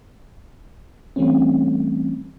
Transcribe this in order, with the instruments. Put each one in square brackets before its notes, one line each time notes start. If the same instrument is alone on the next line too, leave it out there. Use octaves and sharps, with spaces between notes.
[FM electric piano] E3 G3 A3 C4 C#4